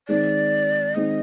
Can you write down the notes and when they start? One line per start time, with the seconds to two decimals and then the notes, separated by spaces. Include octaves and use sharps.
0.08 D#3 G#3 C4 D#4 D5
0.95 D#3 G#3 C4 D#4 D#5